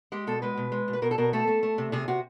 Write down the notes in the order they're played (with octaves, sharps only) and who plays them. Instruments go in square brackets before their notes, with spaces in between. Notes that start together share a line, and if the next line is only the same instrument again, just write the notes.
[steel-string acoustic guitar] G#3 G4
B2 A4
G#3 B4
B2
G#3
B2
B4
B2 A#4
A4
B2 A#4
A3 A4
A3
A3
C3
C3 G#4
C3 F#4